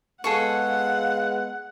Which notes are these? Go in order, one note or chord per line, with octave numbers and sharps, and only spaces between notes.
G#3 B3 G#4 A4 F5 F#5 C#6